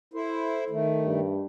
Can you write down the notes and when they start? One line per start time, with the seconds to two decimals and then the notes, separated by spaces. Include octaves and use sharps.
0.14 E4 A4 C5
0.70 D#3 A3
1.04 G2